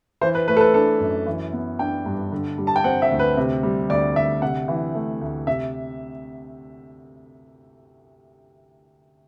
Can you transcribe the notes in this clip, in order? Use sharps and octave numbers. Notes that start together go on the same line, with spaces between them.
E3 C5
B4
A3 B4
A4
B4
D4 A4
F#2
E3
B3
D4 G5
G2
D3
G3
A5
G5
C4 F#5
E5
D2
B4
C3
G3
D2 D5
D2 E5
C3 F#5
E3
A3
D2
C3 E5